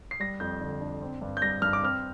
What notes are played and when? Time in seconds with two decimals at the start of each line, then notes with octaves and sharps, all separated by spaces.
0.11 C7
0.20 G3 A#6
0.40 F2 G6
0.61 D3
0.81 D4
1.02 C4
1.22 G2
1.37 G6
1.42 G3 A#6
1.62 G2 F6
1.73 D6
1.83 C4 F6